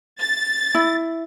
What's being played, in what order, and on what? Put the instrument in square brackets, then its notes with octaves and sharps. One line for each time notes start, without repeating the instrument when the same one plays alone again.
[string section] A6
[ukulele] E4